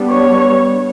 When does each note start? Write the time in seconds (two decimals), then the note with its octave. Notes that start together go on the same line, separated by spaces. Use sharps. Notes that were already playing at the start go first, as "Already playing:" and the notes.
Already playing: G3 B3 D4
0.11 C#5